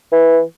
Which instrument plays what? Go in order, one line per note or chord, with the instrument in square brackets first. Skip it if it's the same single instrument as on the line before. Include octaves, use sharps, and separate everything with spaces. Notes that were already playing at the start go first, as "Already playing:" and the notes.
[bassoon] E3